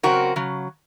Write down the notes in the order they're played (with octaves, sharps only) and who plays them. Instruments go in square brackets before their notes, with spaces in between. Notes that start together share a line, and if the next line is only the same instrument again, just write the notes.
[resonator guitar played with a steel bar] C#3 F#3 C4 F#4 A#4
C#3 F#3